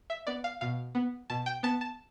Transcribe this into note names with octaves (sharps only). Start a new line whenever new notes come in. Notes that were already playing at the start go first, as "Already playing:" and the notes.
E5
B3 D5
F5
B2 F5
B3
B2 A5
G5
B3 A5
A5